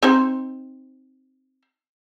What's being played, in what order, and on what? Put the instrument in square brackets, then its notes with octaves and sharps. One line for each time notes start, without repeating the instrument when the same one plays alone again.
[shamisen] C4 D#4 C5